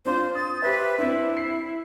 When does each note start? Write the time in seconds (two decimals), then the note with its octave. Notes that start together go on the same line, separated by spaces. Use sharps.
0.05 C4 D4 F4 C5
0.35 D#6 A6
0.62 G4 B4 C5 E5
0.98 C4 D4 E4
1.37 C7